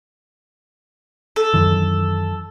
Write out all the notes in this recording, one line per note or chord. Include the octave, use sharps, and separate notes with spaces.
A4
F#2 D#3 E3